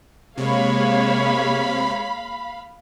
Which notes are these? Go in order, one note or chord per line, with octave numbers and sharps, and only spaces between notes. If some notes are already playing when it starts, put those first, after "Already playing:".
C3 G#3 A#3 C#5 F5 B5